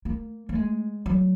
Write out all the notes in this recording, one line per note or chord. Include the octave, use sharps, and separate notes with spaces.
A#3
A#3
G#3
F#3